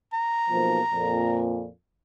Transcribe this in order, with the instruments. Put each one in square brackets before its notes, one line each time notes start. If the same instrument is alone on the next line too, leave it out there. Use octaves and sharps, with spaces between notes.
[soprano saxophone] A#5
[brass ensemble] B1 F3 A#3
F2 A#2